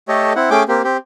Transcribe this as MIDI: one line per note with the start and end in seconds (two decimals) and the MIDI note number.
0.08 0.33 57
0.08 0.33 67
0.08 0.33 69
0.08 0.33 73
0.08 0.33 75
0.36 0.50 60
0.36 0.50 64
0.36 0.50 78
0.50 0.63 57
0.50 0.63 61
0.50 0.63 68
0.50 0.63 79
0.50 0.63 86
0.68 0.82 58
0.68 0.82 60
0.68 0.82 67
0.84 0.97 60
0.84 0.97 67